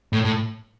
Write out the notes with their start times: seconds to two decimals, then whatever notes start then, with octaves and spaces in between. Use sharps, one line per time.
0.13 A2
0.25 A2